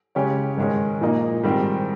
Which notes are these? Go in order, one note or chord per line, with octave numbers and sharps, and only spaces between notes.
C#3 G#3 C#4 G4 C#5
G#2 D#3 G#3 C#4
A#2 F3 A#3 D#4
G#2 D#3 G3 C4 G4